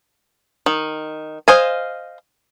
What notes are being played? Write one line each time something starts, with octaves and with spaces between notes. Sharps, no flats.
D#3
C5 D#5 F5 G#5